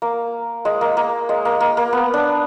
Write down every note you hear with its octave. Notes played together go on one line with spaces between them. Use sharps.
A#3
G#3
A#3
A#3
G#3
A#3
A#3
A#3
B3
D4